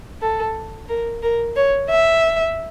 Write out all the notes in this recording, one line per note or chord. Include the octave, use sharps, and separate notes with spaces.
A4
A#4
A#4
C#5
E5